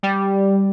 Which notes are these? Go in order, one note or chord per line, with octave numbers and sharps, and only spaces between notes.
G3